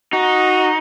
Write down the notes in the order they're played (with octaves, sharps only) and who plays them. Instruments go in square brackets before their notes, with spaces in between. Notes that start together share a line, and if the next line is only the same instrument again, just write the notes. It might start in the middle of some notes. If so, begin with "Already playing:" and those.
[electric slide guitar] D#4 [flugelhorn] F#4